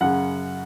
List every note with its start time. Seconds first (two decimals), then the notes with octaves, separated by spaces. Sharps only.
0.01 F#2 C#3 F#5